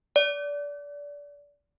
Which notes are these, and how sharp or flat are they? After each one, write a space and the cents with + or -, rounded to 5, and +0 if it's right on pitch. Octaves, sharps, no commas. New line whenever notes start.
D5 -25